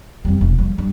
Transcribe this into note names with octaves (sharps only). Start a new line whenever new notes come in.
F2 G3
E1
F3 G3
G2